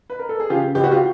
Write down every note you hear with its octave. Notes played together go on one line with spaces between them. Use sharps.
B4
A#4
A4
G#4
C#3 F4 G4
C#2 G4
F#4
F4 G4